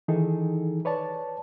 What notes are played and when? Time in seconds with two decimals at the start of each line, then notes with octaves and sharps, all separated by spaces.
0.08 D#3 E3 D#4 G#4 A4
0.85 B4 C#5 D5 A5